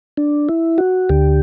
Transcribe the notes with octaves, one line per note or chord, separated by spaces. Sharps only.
D4
E4
F#4
D2 D3 G4